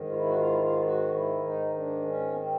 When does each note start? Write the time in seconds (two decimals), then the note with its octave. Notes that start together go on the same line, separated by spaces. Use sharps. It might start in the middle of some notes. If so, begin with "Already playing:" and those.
Already playing: G#2 D#3
0.09 F4
0.15 E4
0.26 F#4
0.37 F4
0.50 E4
0.61 F4
0.83 F#4
1.14 E4
1.44 D#4
1.76 D4
2.06 C#4
2.31 B3
2.36 C4